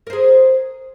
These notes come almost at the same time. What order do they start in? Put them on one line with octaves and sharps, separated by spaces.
A#4 C5 G#4